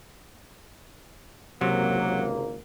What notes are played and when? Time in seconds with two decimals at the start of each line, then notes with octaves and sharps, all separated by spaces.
1.61 G#1 C#2 C3 F#3 A#3